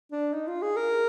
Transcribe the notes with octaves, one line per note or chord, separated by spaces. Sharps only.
D4
D#4
F4
G#4
A#4